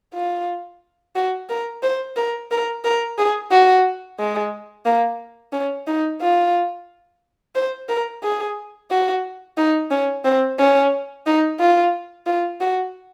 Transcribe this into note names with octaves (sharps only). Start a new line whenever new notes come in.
F4
F#4
A#4
C5
A#4
A#4
A#4
G#4
F#4
G#3
A#3
C#4
D#4
F4
C5
A#4
G#4
F#4
D#4
C#4
C4
C#4
D#4
F4
F4
F#4